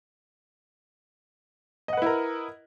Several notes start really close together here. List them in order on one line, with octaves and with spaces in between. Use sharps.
D#5 F#5 B4 E4 A#4